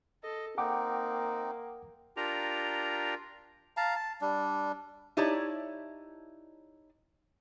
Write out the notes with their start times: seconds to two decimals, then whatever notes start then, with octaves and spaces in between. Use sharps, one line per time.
0.23 A4 D#5
0.58 A#3 C4 D#4 F#5 G5 D6
2.17 D4 F4 G4 A#4 A#5
3.77 F5 A5 A#5
3.95 A5
4.21 G3 D4
5.17 D#4 E4 G4 C#5 D5 A5